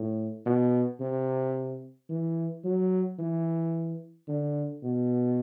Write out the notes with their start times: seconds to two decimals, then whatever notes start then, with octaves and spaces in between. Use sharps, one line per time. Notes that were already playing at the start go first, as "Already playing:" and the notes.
Already playing: A2
0.46 B2
1.00 C3
2.09 E3
2.64 F#3
3.19 E3
4.28 D3
4.83 B2